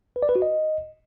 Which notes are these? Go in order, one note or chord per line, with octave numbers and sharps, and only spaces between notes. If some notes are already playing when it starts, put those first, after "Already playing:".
B4
D5
B4
F#4
D#5